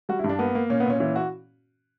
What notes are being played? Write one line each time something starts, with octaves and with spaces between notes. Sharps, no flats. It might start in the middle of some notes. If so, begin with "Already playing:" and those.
G3 F#4
E4
G2
D4
A#3 B3
A#3
A#2 C#4
B3
A#2 C#4
E3 C#4
F#4